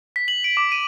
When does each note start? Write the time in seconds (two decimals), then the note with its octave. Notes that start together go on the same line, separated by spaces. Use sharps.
0.16 B6
0.28 F#7
0.44 D7
0.57 D6
0.72 D#7